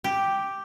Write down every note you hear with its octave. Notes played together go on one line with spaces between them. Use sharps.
G4